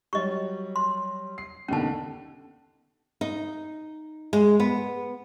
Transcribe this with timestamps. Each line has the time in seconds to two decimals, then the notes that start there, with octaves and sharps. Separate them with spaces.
0.13 F#3 G3 D#5 C#6
0.76 C6
1.38 C7
1.68 D#2 B2 D3 C#4 A5
3.21 D#4
4.33 G#3
4.60 B3